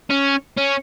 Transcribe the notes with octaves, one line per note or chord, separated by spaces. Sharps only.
C#4
C#4